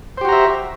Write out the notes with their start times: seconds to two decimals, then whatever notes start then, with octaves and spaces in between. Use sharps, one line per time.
0.17 C5
0.21 G4
0.25 F#4
0.29 A#5
0.32 E5